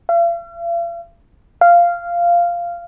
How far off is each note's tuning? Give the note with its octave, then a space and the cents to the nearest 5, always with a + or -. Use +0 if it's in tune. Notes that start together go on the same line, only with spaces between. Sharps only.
F5 -45
F5 -10